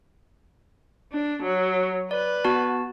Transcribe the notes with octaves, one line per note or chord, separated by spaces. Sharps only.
D4
F#3
B4 D5
B3 F#4 A5